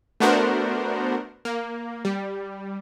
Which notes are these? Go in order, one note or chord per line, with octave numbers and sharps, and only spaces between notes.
A3 B3 D4 F#4 A#4 C5
A#3
G3